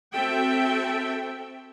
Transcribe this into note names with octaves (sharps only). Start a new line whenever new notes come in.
C4 F#4 A4 E5 G5